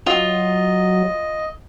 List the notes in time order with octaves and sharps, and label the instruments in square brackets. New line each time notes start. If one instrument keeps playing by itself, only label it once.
[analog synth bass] F#3 [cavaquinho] F4 [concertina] D#5